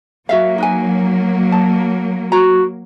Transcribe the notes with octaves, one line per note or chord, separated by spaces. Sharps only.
F#3 A#3 F#4 E5 F5
D#4 B4 G#5
A5
F#4 A#5